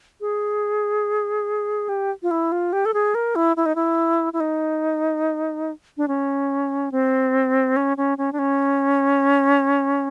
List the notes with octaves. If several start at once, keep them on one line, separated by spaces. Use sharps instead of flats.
G#4
G4
F4
E4
F4
G4
A4
G#4
A#4
E4
E4
D#4
E4
E4
D#4
D4
C#4
C4
C#4
C#4
C#4
D4
C#4